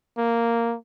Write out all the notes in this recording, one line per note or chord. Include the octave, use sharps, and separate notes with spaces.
A#3